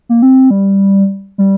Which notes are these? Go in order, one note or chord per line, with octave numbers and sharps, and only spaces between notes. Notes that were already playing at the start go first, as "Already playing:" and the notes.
A#3
C4
G3
G3